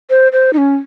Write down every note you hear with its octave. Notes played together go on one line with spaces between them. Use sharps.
C5
C5
D#4
C#4